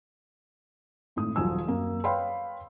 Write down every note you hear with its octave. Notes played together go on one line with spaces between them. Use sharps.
G#1 A2 D#6
D#1 F3 F#3 G#5 E6
F#2 A#3
B4 C#5 F5 G5 B5 C6